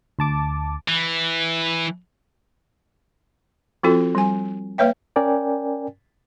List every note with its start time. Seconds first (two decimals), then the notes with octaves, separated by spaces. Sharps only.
0.19 D2 A5 D6
0.88 E3
3.83 F3 C4 F4 F#4 A4
4.15 G3 G#5
4.78 A#3 B4 C#5 E5 G5
5.16 C#4 A#4 D5 G5 G#5